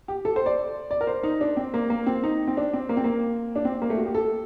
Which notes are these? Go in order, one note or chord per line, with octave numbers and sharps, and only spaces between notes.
G4
A4
C5
D5
D5
A#4
C5
D#4
D4
C4
A#3
A#3
C4
D#4
C4
D4
C4
A#3
C4
A#3
D4
C4
A#3
A3
F#4
G4
A4